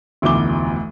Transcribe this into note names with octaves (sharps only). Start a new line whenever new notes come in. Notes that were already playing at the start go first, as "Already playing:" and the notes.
F1 D2 B2 E3 D6 G7